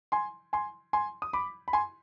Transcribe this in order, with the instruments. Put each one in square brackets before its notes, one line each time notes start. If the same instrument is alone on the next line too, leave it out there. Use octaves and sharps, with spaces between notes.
[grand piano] G#5 C6
G#5 C6
G#5 C6
D#6
B5 D6
B5
G#5 C6